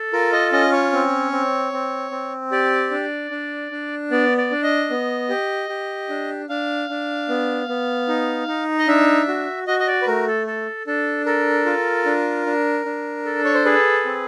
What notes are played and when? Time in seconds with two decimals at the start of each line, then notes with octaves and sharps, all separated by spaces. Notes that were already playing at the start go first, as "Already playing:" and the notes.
Already playing: A4
0.13 F4 A#4
0.32 D#5
0.52 C#4 D#5
0.72 C#5
0.93 C4
1.32 C4
1.73 C4
2.11 C4
2.52 G4 D5
2.91 D4
3.31 D4
3.71 D4
4.11 B3 D5
4.38 D5
4.51 D4
4.63 D#5
4.90 B3
5.29 G4
5.69 G4
6.09 D4
6.49 D4 F5
6.89 D4
7.29 B3
7.69 B3
8.08 D#4
8.48 D#4
8.79 D#5
8.87 D4 E5
9.28 F#4
9.67 F#4 D#5
9.79 D#5
9.87 D5
10.02 B4
10.06 A3 A#4
10.27 A4
10.47 A4
10.87 D4 A4
11.26 A4 A#4
11.66 F4
12.06 D4
12.46 D4
12.85 D4
13.25 A4
13.45 C#5
13.54 C5
13.65 G#4 B4
14.05 C4